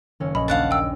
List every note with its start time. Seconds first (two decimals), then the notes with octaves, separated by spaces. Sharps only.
0.20 F#1 D#3 C#4 E6
0.35 A#1 D#5 B5
0.48 D#2 D4 F5 F#5 A5
0.71 G5 E6